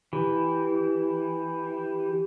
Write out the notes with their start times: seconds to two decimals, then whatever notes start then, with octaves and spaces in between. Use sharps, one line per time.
0.13 E3 G4